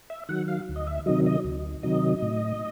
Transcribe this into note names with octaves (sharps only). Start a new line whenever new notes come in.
E5
D#3 F#3 F#5
F5
D2
D#5
E5
C3 D#3 F#3 D#5
D#5
D2
C3 D#3 F#3 D#5
A2